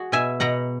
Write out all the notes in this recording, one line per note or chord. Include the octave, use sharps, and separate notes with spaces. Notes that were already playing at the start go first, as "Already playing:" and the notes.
Already playing: F#4 G#4
B2 E5 G#5
B2 F#5 A#5